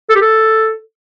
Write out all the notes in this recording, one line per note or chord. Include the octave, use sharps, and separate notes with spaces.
A4
G4
A4